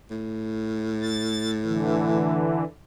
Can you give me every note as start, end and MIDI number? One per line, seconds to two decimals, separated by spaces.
0.10 2.59 45
1.02 1.51 93
1.64 2.64 50
1.64 2.64 52